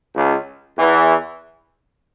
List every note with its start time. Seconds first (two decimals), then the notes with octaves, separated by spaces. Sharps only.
0.15 C#2 C#3
0.77 E2 E3